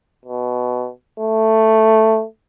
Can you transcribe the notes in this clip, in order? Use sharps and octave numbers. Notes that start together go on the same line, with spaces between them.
B2
A3